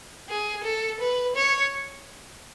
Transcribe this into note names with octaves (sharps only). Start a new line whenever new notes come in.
G#4
A4
B4
C#5